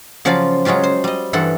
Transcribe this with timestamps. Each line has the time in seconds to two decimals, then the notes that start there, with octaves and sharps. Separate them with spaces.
0.25 C#3 F3 F#3 F4 D5 F5
0.65 F#3 G#3 C#4 F4 G4
0.83 C5
1.04 G3 D#5
1.33 G2 E3 A4 F#5 C6